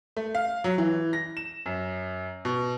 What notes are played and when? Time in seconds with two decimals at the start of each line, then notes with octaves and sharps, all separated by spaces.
0.17 A3
0.35 F5
0.64 F#3
0.78 E3
1.13 A#6
1.37 E7
1.66 F#2
2.45 B2